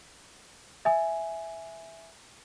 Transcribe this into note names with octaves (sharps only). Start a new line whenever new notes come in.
E5 G#5